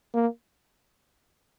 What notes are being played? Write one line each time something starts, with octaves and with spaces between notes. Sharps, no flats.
A#3